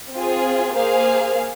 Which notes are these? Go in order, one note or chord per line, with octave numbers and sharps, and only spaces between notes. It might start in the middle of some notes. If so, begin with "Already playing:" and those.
C4 F4 G#4
A#3 G#4 C5 F5